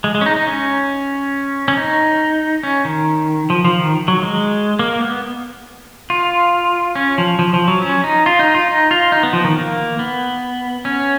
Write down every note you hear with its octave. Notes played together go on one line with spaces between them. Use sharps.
G#3
G#3
C#4
D#4
D#4
C#4
C#4
D#4
C#4
D#3
F3
F3
D#3
F#3
G#3
A#3
B3
F4
C#4
F3
F3
F3
F#3
C#4
D#4
F4
D#4
F4
D#4
F4
D#4
B3
F3
D#3
A#3
B3
C#4